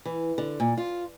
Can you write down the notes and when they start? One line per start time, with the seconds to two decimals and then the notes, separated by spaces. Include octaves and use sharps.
0.06 E3
0.38 D3
0.60 A#2
0.78 F4